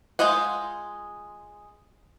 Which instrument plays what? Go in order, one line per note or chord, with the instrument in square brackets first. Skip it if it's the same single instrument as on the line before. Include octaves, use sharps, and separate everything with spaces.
[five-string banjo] G#3 F4 C5 D#5 F#5